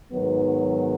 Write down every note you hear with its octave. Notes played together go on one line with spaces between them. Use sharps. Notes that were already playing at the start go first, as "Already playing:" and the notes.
G#2 D#3 F#3 B3